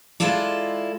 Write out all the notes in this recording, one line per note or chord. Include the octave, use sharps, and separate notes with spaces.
G#3 E4 F4 A4 D5